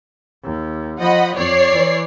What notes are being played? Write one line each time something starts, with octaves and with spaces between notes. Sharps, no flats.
D#2
F3 D#5 F#5 B5
F2 C#5 D5 C7
E3